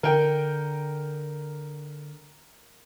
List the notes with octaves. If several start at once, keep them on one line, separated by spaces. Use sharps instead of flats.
D3 A#4 G5